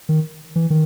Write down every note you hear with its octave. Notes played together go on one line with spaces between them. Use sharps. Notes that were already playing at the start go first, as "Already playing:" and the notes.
D#3
E3
D#3